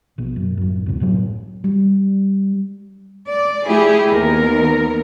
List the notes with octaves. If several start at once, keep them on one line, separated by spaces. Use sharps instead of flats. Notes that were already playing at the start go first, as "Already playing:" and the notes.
A#1 B2
F#2
A1 F#2
D2 G#2 C3
F#1 A2 F#3
G3
D5
A3 E4 G4 G#4
D#2 B3 A#4